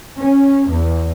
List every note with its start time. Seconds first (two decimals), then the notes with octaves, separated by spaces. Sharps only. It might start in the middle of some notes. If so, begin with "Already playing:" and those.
0.19 C#4
0.69 E2